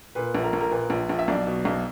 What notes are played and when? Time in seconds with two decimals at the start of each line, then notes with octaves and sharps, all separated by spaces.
0.15 A#2 B4
0.35 A#1
0.44 A#4
0.53 A#1
0.61 A#4
0.71 A#2 B4
0.90 A#1
1.09 A#1
1.19 E5
1.28 B1 D5
1.47 B2
1.65 B1